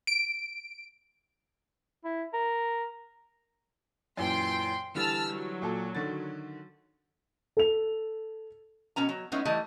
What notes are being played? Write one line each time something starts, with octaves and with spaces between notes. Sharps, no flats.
D7
E4
A#4
F#2 A#2 E3 G5 C6
D3 E3 G3 A5 E6 F6
F#3
A#2 A4
D3 D#3 A6
A4 F7
B2 B3 C#4 A#5
F#3
G#3 A3 B3 C#4 D#4 E4
E3 G3 A3 D#5